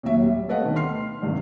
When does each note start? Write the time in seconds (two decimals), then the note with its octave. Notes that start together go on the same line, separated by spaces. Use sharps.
0.03 D#2 A#2 F#3 E5
0.22 A2 G3
0.49 A4 B4 C#5 D#5 F5 F#5
0.62 D2 B2 D#3 D4
0.76 C6 F6 C7
1.22 G#1 G2 C3